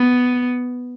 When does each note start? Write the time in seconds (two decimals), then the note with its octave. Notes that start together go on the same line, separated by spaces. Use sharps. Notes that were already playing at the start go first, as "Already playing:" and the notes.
Already playing: B3